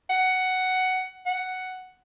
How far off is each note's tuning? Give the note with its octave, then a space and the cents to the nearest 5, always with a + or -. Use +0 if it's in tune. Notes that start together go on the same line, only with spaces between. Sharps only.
F#5 +10
F#5 +5